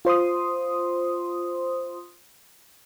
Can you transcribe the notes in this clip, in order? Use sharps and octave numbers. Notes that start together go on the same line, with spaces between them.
F4 C5 C6 D#6